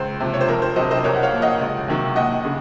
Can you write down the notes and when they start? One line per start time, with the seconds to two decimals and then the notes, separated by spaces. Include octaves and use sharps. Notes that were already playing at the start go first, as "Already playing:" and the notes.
Already playing: C#2 C5
0.20 C3 F3
0.34 C#5
0.41 C5
0.48 F2 A#4
0.62 C5
0.76 C3 F#3 C5 D#5
0.91 C5 D#5
1.04 C2 A#4 C#5
1.15 F#5
1.23 C#5 F5
1.32 A#2 F3
1.42 D#5 F#5
1.60 C#2
1.88 C3 D#3 F#3
2.16 D#2 D#5 F#5
2.45 C#3